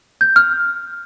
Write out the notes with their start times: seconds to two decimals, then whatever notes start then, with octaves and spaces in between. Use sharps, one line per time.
0.21 G6
0.36 F6